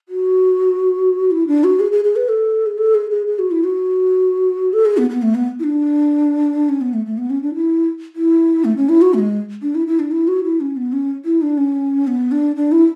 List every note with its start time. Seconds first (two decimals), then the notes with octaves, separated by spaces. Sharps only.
0.09 F#4
1.31 E4
1.47 D4
1.64 F#4
1.80 G#4
1.92 G#4
2.04 G#4
2.16 B4
2.29 A4
2.66 G#4
2.78 A4
2.95 G#4
3.11 G#4
3.27 G#4
3.39 F#4
3.51 E4
3.64 F#4
4.73 A4
4.86 G#4
4.98 B3
5.10 B3
5.22 A3
5.35 B3
5.59 E4
5.64 D4
6.69 C#4
6.81 B3
6.94 A3
7.06 A3
7.18 B3
7.30 C#4
7.42 D4
7.55 E4
8.16 E4
8.65 A3
8.77 C#4
8.89 E4
9.02 F#4
9.14 A3
9.19 G#3
9.62 D4
9.75 E4
9.87 E4
9.99 D4
10.11 E4
10.28 F#4
10.44 E4
10.61 C#4
10.77 B3
10.93 C#4
11.25 E4
11.42 D4
11.58 C#4
12.07 B3
12.32 D4
12.56 D4
12.72 E4